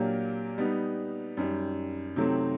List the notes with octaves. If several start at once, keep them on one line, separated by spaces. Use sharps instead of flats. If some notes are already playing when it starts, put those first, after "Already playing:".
Already playing: A#2 F#3 A#3 D4 G4
G3 B3 D#4
F#2 D#3 G3
C3 D#3 F#3 A3 C4